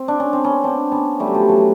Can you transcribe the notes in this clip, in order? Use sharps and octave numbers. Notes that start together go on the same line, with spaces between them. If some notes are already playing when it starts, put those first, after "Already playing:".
Already playing: C4
D4
C#4
C4
B3 C#4
C4 D4
B3 C#4
G3 A3
F#3
F3 G3
E3 F#3